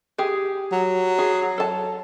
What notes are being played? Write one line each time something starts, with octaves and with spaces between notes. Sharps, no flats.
G4 G#4
F#3
G#4
A4 A5